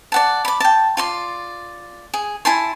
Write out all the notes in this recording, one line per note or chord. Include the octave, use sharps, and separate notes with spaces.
D5 F#5 A5
B5 D6
G5 A5
F4 D5 C6
G#4
E4 G#5 A5 C6